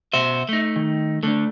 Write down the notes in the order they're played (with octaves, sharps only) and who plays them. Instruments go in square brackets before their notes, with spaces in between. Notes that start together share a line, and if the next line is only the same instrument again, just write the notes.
[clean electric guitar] B2 F#4 C5 [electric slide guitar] E5
[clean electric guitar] A3 D#4
[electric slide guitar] D#3
[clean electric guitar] D3 [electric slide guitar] A3 D4